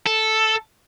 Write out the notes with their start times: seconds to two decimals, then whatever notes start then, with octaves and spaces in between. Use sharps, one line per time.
0.07 A4